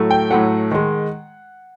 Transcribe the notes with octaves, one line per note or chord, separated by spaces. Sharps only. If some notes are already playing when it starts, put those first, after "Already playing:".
Already playing: A2 F#3 A3
G5
A2 F#3 A3 F#5
D#3 G#3